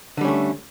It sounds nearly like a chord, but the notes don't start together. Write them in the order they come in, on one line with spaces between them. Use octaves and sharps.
D3 G3 C#4 A3